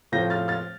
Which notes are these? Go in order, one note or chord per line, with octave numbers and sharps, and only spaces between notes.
A2 F3 C4 F4 G6 A#6
F6 A6
F6 A6